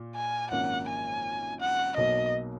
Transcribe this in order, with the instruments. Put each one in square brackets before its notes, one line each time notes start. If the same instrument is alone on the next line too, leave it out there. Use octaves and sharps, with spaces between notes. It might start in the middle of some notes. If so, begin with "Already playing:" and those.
Already playing: [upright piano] A#2
[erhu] G#5
[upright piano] G#1 F#2 F3 A#3 [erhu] F#5
[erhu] G#5
F#5
[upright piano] B1 B2 F#3 A#3 [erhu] D#5